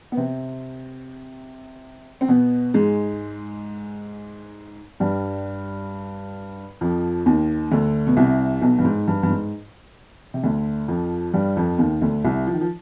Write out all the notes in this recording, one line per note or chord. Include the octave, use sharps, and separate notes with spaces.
B3
C3 C4
C4
B2 B3
G#2 G#3
G2 G3
F2 F3
D#2 D#3
D2 D3
B2
C2 C3
B1 B2
G2
G#2
G2
G2
G#2
C3
D2 D3
F2 F3
G2 G3
F2 F3
D#2 D#3
D2 D3
C2 C3
F3
D#3
F3